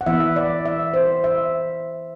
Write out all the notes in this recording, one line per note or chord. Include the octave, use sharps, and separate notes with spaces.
F#5
E3 B3 E4 E5
D5
E5
C5
E5